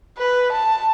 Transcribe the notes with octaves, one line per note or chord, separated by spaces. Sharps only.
B4
A5